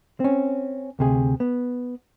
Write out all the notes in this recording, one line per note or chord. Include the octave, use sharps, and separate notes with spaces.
C4 C#4
D2 C3 G#4
B3